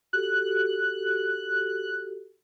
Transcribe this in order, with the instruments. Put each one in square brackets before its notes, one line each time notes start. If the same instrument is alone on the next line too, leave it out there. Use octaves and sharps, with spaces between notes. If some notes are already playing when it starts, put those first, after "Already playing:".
[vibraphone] F#4 G4 A4 [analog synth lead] F#6